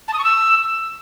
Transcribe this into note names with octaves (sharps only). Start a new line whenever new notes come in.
A5
D#6
C#6
E6